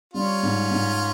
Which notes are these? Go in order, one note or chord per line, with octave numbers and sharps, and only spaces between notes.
G3 C#4 F4
G#2
G#2